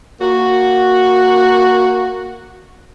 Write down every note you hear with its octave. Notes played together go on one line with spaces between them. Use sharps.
A#3 F#4